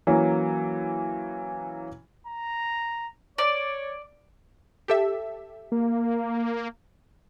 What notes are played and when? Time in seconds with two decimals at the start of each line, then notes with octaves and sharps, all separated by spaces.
0.07 E3 F#3 A#3 C#4
2.27 A#5
3.38 C#5 D5
4.88 G4 A4 E5
5.72 A#3